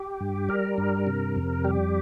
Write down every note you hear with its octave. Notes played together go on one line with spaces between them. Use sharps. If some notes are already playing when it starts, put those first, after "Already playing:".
Already playing: G4
G2
G3 A#4
G2
C3
F2
G3 G4